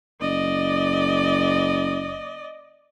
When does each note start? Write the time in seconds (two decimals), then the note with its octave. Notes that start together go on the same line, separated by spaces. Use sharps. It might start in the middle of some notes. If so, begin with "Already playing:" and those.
0.21 F#1 D5 D#5